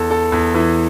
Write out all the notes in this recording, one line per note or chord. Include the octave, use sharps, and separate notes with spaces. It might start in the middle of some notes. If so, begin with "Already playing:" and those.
Already playing: E2 A4
A4
E2
E3